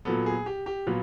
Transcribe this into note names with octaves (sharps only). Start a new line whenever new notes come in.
A#2 F#3 B3 A4
G#4
G4
G4
A#2 F#3 B3 F4